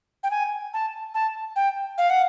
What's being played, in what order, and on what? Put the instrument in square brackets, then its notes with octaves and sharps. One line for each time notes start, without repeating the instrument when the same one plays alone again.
[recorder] G5
G#5
A5
A5
G5
F5
F#5